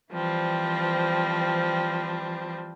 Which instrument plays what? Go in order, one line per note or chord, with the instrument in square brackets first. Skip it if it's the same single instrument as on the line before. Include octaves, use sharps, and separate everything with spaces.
[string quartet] E3 F3 G3 C4